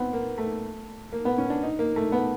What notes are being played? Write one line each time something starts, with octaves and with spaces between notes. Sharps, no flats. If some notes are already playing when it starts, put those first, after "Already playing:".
Already playing: B3 C4
A#3
A3
A#3
B3
C#4
D4
D#4
A#3
A3
B3